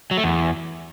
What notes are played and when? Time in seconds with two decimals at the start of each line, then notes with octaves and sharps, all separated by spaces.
0.11 F#3
0.17 A3
0.24 E2